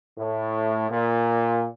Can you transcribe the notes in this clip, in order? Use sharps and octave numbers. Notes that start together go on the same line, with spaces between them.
A2
A#2